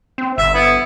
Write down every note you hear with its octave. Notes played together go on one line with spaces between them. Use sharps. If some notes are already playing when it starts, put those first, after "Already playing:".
C4
G1 E5
B3 E4